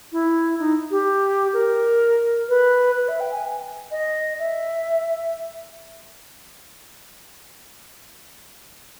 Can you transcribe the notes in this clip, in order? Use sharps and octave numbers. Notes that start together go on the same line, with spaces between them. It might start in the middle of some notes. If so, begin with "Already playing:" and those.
E4
D#4
G4
A#4
B4
B4
E5
G5
G#5
D#5
E5